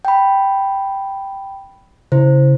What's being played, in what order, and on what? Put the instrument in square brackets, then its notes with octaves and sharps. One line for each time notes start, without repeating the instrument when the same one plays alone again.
[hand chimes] G5 B5
[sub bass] C#3 [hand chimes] E4 C5